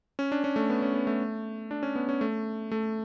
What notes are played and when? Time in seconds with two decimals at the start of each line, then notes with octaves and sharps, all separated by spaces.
0.19 C#4
0.32 D4
0.44 C#4
0.56 A3
0.70 B3
0.82 C#4
0.94 B3
1.07 A3
1.71 D4
1.83 C#4
1.95 B3
2.09 C#4
2.21 A3
2.71 A3